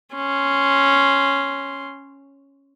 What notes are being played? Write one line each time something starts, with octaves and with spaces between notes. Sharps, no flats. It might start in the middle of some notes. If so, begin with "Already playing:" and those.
C#4 C6